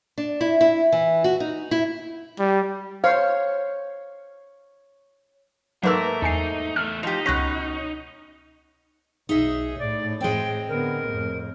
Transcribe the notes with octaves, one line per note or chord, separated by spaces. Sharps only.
D4
E4
E4
E3
F#4
D#4
E4
G3
C5 C#5 F5
G#2 F#3 A3 A#3 A#4 B4 E6
E2 D#4 G#5 C7
E2 A3 F6
F3 D#4 G4
C#2 B2 C#4 F#6 A#6
B1 D#4 G#4 E5
A2 D5
G#3 C4 G5
D3 B3 A#4
F2 A2